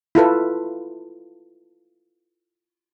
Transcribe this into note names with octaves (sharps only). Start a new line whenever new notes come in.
E4 F4 A4 B4